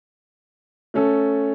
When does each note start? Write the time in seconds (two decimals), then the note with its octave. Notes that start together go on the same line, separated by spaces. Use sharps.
0.94 A3 C#4 A4